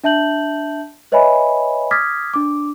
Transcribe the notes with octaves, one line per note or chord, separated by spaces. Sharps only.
D4 E5 A5 G6 F#7
B4 C#5 D#5 E5 G#5 B5
D6 D#6 F6 G#6 A6 B6
D4 D6